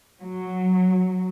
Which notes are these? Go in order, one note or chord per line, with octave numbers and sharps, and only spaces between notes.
F#3